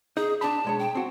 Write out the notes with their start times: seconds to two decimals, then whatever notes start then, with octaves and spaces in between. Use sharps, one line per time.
0.17 D#4 G#4
0.41 D4 A5 B5
0.65 B1 G#3 C#5
0.79 G5
0.95 C4 F#4